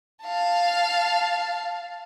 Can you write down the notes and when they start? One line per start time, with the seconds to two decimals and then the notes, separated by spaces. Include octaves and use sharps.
0.23 F5 A5